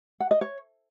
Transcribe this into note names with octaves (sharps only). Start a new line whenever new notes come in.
F#5
D#5
C#5